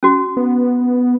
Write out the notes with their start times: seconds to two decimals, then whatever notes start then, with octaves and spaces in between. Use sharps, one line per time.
0.03 C#4 F#4
0.37 B3